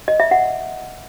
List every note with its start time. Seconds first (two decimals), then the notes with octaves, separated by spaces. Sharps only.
0.08 D#5
0.20 E5
0.31 F#5